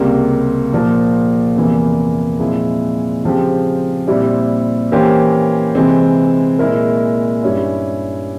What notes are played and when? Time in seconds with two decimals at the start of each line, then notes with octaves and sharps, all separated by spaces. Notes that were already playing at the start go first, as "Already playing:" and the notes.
Already playing: C#2 C3 G3 A#3
0.73 A#2 F3 A#3
1.56 E2 C3 E3 A#3
2.40 A#2 F3 G#3 C4 E4
3.23 C#3 F3 G#3 C4 G4
4.07 A#2 G3 C4 E4
4.92 E3 A#3 C#4 G4 C5
5.75 C3 E3 G#3 C4
6.59 A#2 G#3 E4 A#4
7.43 G2 G3 C#4 E4